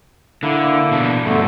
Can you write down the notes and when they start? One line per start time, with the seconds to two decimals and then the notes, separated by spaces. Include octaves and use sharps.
0.43 D3 A#3 E4
0.91 B2 D4
1.25 G2 B2 D3 A3